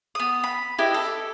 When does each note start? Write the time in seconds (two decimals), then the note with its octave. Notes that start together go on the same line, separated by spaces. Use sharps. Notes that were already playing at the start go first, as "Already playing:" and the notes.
0.15 B3 D#6
0.44 B5
0.79 E4 G4 B4 D#5
0.94 A4